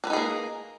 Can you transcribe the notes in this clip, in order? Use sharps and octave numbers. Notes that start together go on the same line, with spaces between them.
A#3 D4 D#4 G#4 B4